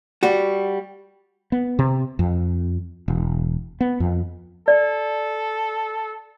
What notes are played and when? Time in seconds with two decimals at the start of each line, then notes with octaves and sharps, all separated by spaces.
0.23 G3 F#4
1.52 B3
1.79 C3
2.19 F2
3.08 E1
3.81 B3
4.00 F2
4.68 A4 D5